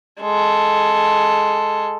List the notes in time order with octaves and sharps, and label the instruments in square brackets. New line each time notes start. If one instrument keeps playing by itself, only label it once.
[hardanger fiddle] G#3 A4